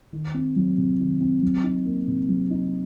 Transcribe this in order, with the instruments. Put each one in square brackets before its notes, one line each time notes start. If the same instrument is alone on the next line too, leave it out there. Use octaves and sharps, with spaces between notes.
[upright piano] D#3
C4
F#3
C3
D#3
C4
F#3
D#4
A#3
C3
F#3
D#4